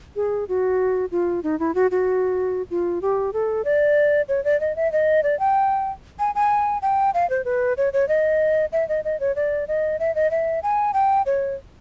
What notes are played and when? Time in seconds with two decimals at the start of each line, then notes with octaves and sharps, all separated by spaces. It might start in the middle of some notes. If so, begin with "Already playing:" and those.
0.16 G#4
0.49 F#4
1.11 F4
1.43 D#4
1.60 E4
1.75 F#4
1.91 F#4
2.70 F4
3.02 G4
3.33 A4
3.65 D5
4.28 C#5
4.44 D5
4.60 D#5
4.76 E5
4.92 D#5
5.23 D5
5.39 G5
6.19 G#5
6.35 G#5
6.82 G5
7.14 F5
7.30 C5
7.45 B4
7.77 C#5
7.93 C#5
8.08 D#5
8.72 E5
8.89 D#5
9.05 D#5
9.20 C#5
9.36 D5
9.68 D#5
10.00 E5
10.15 D#5
10.31 E5
10.63 G#5
10.94 G5
11.26 C#5